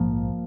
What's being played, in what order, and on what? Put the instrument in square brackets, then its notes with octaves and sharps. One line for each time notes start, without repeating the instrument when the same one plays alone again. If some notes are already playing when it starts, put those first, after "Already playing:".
Already playing: [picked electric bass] A#1 G#2 F3 A#3